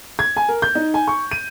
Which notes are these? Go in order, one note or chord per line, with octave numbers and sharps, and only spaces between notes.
G#6
G#5
A#4
G6
D#4
G#5
C#6
D#7